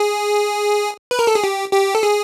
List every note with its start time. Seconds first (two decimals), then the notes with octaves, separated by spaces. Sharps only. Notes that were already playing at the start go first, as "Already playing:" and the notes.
Already playing: G#4
1.11 B4
1.19 A#4
1.27 A4
1.35 G#4
1.44 G4
1.73 G4
1.95 A4
2.03 G#4